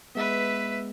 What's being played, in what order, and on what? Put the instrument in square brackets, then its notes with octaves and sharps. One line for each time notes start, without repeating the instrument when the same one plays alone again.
[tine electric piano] G#3 B3 [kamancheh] B4 E5